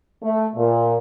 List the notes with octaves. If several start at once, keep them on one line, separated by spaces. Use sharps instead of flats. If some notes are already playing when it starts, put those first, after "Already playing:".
A3
A#2